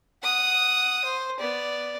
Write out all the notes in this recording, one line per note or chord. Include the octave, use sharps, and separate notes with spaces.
F#5 D#6
C5
B3 D5